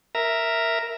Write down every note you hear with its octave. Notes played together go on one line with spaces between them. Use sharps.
A#4 E5 A#5